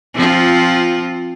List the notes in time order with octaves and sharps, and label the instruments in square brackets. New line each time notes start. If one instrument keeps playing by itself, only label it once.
[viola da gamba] F3 C4 F4